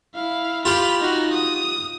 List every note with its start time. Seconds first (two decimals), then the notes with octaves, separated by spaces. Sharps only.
0.15 E4 F5
0.65 F4 G4 F5 B5
1.00 D#4 F#4
1.33 D#6